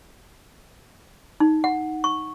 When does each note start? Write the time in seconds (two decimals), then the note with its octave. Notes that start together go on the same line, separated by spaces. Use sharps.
1.40 D#4
1.64 F#5
2.04 C#6